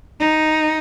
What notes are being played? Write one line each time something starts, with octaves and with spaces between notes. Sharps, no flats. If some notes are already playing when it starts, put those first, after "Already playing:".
D#4